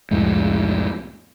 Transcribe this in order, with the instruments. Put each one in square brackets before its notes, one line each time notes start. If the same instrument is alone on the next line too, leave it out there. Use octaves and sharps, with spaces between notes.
[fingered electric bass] C2 F2 A2 G#3